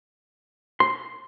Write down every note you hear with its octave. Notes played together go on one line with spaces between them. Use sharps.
C6